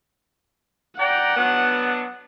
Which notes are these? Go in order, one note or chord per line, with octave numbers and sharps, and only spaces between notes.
D5 F#5 G5 A#5
F#3 B3 D4